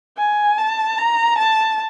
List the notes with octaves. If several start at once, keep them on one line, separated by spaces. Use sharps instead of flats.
G#5
A5
A#5
A5